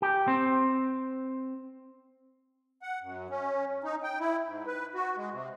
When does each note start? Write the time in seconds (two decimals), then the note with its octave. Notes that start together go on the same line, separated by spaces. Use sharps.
0.02 G4
0.28 C4
2.82 F#5
3.02 F#2
3.30 C#4
3.84 D#4
4.03 G5
4.19 E4
4.46 G#2
4.66 B4
4.95 F#4
5.17 G#3
5.32 C3